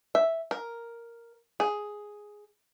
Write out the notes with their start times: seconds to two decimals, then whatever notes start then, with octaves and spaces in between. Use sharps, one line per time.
0.15 E5
0.51 A#4
1.60 G#4